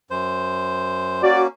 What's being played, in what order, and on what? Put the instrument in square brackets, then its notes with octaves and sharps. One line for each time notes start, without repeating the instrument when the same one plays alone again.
[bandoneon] F#2 C5
[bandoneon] A#3 C#4 [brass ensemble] F#4 D5